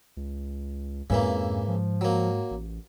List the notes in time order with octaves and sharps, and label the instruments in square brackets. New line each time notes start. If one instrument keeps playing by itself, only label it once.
[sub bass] C#2
[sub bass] F2 [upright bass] G#2 [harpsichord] C#3 E3 A#3
[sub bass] F3
[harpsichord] F#3 A#3
[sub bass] A1